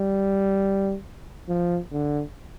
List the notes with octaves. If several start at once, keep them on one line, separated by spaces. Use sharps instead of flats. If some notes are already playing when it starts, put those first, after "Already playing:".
Already playing: G3
F3
D3